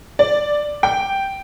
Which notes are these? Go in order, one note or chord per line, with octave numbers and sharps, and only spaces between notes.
D5
G5